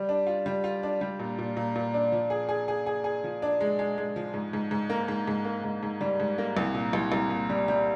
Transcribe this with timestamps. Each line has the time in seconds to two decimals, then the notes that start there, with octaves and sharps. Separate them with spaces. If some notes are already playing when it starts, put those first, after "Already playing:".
Already playing: G3
0.09 D4
0.27 F4
0.46 G3
0.64 F4
0.83 D4
1.01 G3
1.19 A#2
1.38 A#2
1.57 A#2
1.75 A#2
1.94 D4
2.12 F3
2.30 G#4
2.49 G#4
2.68 G#4
2.86 G#4
3.04 G#4
3.24 F3
3.42 D4
3.61 G#3
3.79 G#3
3.98 G#3
4.16 F3
4.34 G#2
4.53 G#2
4.71 G#2
4.90 A#3
5.08 G#2
5.28 G#2
5.45 A#3
5.64 G#2
5.83 G#2
6.01 G3
6.20 G#2
6.38 A#3
6.57 C2
6.74 A#2
6.93 C2
7.12 C2
7.30 A#2
7.50 G3
7.68 G3